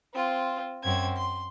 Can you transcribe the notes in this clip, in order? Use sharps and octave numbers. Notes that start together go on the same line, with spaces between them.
C4 F4
F#2 C4 G#6
C6